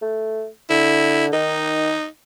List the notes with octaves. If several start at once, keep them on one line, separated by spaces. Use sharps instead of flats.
A3
D3 E4
D#3 D#4